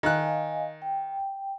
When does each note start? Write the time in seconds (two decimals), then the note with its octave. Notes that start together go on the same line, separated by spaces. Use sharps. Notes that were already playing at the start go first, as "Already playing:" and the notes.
0.03 D#3 D#5 F5 G#5 F#6
0.82 G5